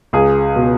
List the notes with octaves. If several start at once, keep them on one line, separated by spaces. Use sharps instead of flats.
C#2 G#4
B2